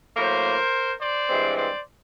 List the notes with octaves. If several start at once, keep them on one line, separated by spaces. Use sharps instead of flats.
A2 F#3 A#3 A#4 C5
C5 D5
G2 E3 G#3 C4
C5 D5